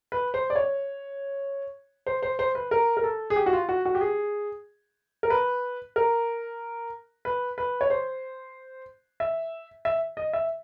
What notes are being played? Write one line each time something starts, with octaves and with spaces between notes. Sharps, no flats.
B4
C5
D5
C#5
C5
C5
C5
B4
A#4
A#4
A4
G#4
G4
F#4
F4
F#4
F#4
G4
G#4
A#4
B4
A#4
B4
B4
C#5
C5
E5
E5
D#5
E5